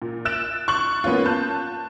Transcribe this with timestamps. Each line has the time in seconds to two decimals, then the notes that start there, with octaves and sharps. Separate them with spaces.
0.02 A#2
0.25 E6 F#6 A6 D7 E7
0.68 C#6 F#6 A6 F#7
1.04 A#3 B3 C#4 F4
1.26 A5 F#6 G6